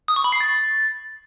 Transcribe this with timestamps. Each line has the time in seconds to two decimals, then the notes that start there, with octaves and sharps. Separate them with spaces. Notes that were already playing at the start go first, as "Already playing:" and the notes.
0.08 D#6
0.16 C#6
0.24 B5
0.32 C7
0.40 A6